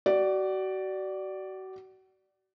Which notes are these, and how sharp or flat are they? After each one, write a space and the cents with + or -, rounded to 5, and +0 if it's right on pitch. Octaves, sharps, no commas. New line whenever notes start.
F#4 +35 D5 +0